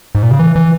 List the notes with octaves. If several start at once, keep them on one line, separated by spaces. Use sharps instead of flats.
G#2
A#2
C#3
E3
E3